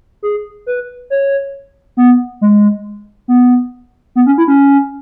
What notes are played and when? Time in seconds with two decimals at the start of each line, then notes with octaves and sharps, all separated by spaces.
0.23 G#4
0.67 B4
1.10 C#5
1.97 B3
2.41 G#3
3.28 B3
4.16 B3
4.26 C#4
4.38 E4
4.48 C#4